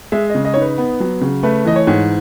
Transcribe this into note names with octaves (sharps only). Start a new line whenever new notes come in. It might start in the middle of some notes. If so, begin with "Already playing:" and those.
G#3 E5
D#5
C#3
D#5
D#4 C#5
B4
B3
F#3
C#3
A3 B4
E3 D#5
C#5
G#2